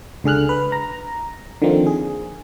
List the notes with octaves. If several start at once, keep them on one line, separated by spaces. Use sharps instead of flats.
C#2 D3 G#4 F6 F#6
B4
A#5
D3 D#3 F3 A#3 C4
G#4